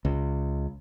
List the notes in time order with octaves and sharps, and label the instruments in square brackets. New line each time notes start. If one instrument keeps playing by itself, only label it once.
[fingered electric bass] C#2